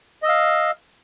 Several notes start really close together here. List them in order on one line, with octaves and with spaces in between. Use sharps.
D#5 E6 F5